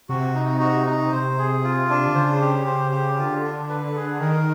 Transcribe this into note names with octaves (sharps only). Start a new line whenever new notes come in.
C3 F#4
D#4
F#4
D#4
C3 C5
G#4
F4
D4
D3
C#3 C5
G4
C5
G4
D3 F4
D4
B4
G#4
D#3 A#4